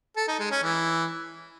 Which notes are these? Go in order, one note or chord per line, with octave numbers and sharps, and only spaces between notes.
A4
D#4
G#3
C#4
E3